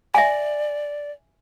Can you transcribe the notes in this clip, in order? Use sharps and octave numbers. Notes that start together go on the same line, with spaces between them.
D5 E5 G#5